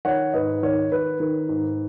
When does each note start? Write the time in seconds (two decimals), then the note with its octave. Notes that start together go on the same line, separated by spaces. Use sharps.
0.05 D#3 C#5 F#5
0.34 G#2 B4 D#5
0.63 D#3 C#5
0.92 D#3 B4
1.20 D#3
1.49 G#2